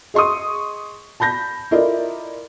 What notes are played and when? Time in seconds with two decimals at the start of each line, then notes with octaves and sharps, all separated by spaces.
0.14 G#4 D#5 C6 C#6 D#6
1.20 A5 B5 G6 A#6
1.71 E4 F4 A4 A#4 D5 D#5